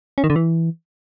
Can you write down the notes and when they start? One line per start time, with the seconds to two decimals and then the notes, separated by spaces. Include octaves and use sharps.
0.18 C#4
0.24 D#3
0.30 D3
0.36 E3